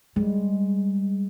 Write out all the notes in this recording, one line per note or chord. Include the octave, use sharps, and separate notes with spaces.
G3 G#3